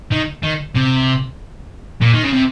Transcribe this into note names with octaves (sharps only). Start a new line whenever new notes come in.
D#3
D#3
C3
A#2
D#3
C#3
C3